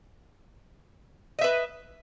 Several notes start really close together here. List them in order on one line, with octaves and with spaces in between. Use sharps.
D#5 E5 B4